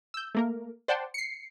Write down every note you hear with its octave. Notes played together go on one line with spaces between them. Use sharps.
E6 G6
A3 A#3 A#4
C5 D5 F#5 G5 A5 C6
C7 C#7